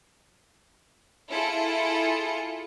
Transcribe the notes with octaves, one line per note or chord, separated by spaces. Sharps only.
E4 F4 G#4 A4 C#7